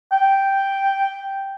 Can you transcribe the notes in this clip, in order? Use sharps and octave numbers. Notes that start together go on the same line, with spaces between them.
G5